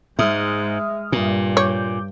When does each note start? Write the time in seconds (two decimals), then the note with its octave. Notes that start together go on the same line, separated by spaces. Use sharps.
0.19 G#2 G#3 E5 D#6 F6
1.12 G2 A#2
1.57 C#5 D6 G6